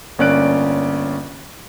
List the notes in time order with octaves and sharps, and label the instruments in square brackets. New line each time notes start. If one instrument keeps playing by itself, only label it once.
[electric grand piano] G1 A#3 C#4 D5 F#6 D7